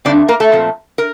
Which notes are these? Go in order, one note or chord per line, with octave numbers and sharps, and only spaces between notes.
G2 D3 A3 C4 D4 D5
A#3 A#4
A3 A4
A#2 F3 A3 C4
A#4